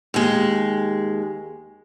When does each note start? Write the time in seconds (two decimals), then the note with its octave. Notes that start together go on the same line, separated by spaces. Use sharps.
0.14 D#2 G#3